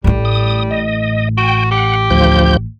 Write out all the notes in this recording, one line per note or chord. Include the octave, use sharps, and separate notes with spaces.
A1 A2 G3
D#6
D#5
F#4 G5
G4 F#5
D2 F3 G6